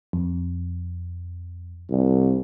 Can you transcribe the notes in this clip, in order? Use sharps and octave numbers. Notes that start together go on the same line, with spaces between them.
F2
C2